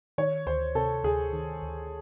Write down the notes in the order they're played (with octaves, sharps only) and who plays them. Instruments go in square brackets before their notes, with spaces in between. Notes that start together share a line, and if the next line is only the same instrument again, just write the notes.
[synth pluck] D#3 [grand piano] C#5
[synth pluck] D2 [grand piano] C5
[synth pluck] C3 [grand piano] A4
[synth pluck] D2 [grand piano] G#4
[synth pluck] D#3
D2